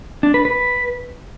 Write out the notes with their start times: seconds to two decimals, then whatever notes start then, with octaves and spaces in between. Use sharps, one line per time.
0.23 D4
0.34 B4
0.45 B4